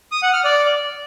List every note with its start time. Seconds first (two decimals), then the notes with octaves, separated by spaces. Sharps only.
0.12 D#6
0.22 F#5
0.33 F6
0.44 D5